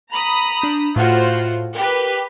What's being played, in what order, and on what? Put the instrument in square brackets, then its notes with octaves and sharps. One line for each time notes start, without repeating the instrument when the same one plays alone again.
[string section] A#5 B5 D#6
[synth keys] D4 G6 E7
[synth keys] A2 F5 [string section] F4 F#4 C5
[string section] G4 B4 [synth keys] A#4